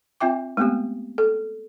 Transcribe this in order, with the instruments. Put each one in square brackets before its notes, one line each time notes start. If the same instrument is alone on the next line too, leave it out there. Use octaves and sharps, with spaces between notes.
[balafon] C4 F4 E5 G5 D6
G#3 A3 B3 C4 G4
A4